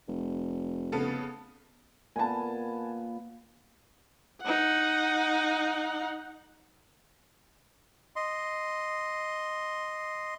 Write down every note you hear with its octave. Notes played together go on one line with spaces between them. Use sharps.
F1
C#3 B3 A4
A#2 B3 G#5 A5
D#4 F#5
D#5 C6